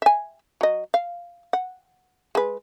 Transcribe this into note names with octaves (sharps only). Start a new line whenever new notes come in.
E5 G#5
F#3 D#5
F5
F#5
G#3 B4